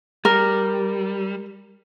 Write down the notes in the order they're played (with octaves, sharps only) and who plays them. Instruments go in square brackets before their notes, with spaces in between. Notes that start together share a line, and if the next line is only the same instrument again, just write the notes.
[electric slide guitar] G3 [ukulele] A#4